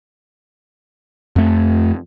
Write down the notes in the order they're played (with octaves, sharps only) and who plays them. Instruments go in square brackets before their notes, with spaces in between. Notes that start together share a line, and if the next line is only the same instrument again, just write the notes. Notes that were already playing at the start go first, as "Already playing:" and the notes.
[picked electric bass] F2 A3